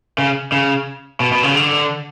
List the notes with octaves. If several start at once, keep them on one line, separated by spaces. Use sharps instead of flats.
C#3
C#3
B2
B2
C#3
D3